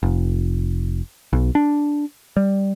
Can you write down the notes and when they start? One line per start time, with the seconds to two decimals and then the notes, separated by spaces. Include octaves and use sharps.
0.03 F1
1.33 B1
1.55 D4
2.37 G3